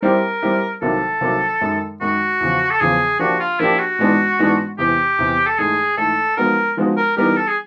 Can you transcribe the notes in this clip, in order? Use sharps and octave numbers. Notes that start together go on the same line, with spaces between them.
G3 C4 E4 G4 A#4
G3 C4 E4 G4
C2 C3 D#3 F#3 A#3 A4
C2 C3 D#3 F#3 A#3
F#2 D#3 G#3
F#2 D#3 G#3 F#4
E2 C#3 F3
A4
E2 C#3 F3 G#4
F3 A#3 D4 F#4 G4
F4
F3 A#3 D4 E4 G4
F#4
G#2 E3 G#3 B3 D4
G#2 E3 G#3 B3 D4
E2 C3 E3 G4
E2 C3 E3
A4
G#2 E3 A3 G#4
G#2 E3 A3 A4
F3 G#3 B3 D#4 F#4 A#4
F3 G#3 B3 D#4 F#4
A#4
E3 G3 B3 D#4 G4 A#4
A4
G#4